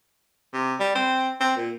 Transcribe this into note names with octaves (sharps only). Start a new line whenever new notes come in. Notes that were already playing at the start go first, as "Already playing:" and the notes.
C3
G3
C4
C4
A#2